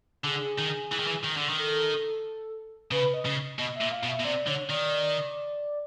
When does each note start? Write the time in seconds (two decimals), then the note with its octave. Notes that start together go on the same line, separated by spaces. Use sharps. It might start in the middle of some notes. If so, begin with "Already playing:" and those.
0.24 D3 G#4
0.58 D#3
0.92 E3
0.99 D#3
1.07 E3
1.24 D#3
1.37 D3
1.49 D#3
1.58 A4
2.91 C#3 B4
3.14 D#5
3.26 C#3
3.58 B2 D#5
3.76 E5
3.81 A#2
3.91 F5
4.03 B2
4.09 E5
4.20 B2
4.25 C3 D5
4.48 D3 C#5
4.69 D#3 D5